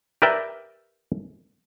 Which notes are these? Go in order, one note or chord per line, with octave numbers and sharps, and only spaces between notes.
G4 A#4 B4 D5 E5 G5